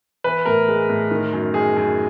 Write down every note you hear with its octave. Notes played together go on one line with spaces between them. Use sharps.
E3 B4
A2 A#4
G#3
A2
D#3
F#2
G#3 G#4
F#2